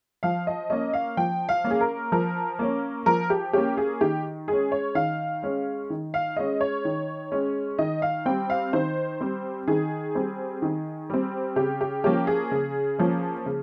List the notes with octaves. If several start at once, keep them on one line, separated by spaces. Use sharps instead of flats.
F3 F5
D#5
A#3 C#4 D#5
F5
F3 G5
F5
A#3 C#4
G#4
A#4
F3 A#4
A#3 C#4
F3 A#4
G4
A#3 C#4 G4
G#4
D#3 G4
G#3 C#4 G#4
C#5
D#3 F5
G#3 C#4
D#3
F5
G#3 C#4 D#5
C#5
D#3
G#3 C#4
D#3 D#5
F5
G3 C4 G5
F5
D#3 C5
G3 C4
D#3 G#4
G3 C4
D#3
G3 C4
C#3 G4
G4
F3 A#3 C#4 G4
G#4
C#3
F3 A#3 C#4
C#3